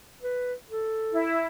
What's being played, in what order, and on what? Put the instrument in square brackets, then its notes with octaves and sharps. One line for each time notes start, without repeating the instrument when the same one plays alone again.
[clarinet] B4
A4
[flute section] E4